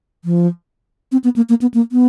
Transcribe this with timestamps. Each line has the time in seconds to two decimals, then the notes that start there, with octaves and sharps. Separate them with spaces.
0.25 F3
1.12 C4
1.24 B3
1.36 A#3
1.49 A#3
1.62 B3
1.74 A#3
1.92 B3